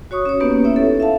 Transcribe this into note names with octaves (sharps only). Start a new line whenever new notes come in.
F#4 C#5 C#6 D#6
C#4 C#5
A#3 B3 C#4 D#4 G4 B4
C#4 E4 C#5 E5
A4
E5 F5 A5